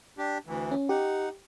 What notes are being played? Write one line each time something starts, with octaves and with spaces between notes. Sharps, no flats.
D4 G4
D2 E3
C#4
D#4 G4 F#5